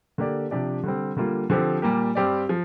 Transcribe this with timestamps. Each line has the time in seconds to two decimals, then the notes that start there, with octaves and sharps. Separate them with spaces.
0.18 D3 A#3 G4 D5
0.51 C3 F3 D4 G4 D5
0.83 D3 G3 C4
1.17 D3 G3 A#3 F4
1.50 D3 F3 C4 G4 C5
1.82 A#2 G3 A#3 G4
2.15 G2 G3 C4 G4 D5
2.49 F3